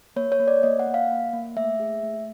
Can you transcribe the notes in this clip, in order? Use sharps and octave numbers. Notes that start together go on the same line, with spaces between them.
A#3 C#5
C#5
A#3
D5
A#3 D#5
F#5
A#3
F5
A#3
A#3
A3 E5
G#4
A3